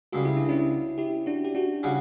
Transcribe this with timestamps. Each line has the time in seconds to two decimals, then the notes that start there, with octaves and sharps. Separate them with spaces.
0.12 C#2 C#3 G3 F#4
0.25 E4
0.37 D4
0.49 C#4 E4
0.98 E4 G4
1.26 D4 F#4
1.44 G4
1.55 D4 F#4
1.83 C#3 G3 C#4 F#4